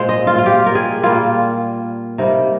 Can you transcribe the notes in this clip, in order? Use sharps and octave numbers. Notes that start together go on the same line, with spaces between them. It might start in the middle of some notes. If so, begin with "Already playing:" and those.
Already playing: A#2 G#3 C5
D#5
F4
F4
G4
A#4
G#4
A#2 G3 A#3 F4
C3 G3 A#3 D#4